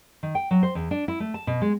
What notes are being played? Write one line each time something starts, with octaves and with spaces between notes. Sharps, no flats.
D#3
G5
F#3
C5
E2
D4
E4
A3
A5
B2
G#3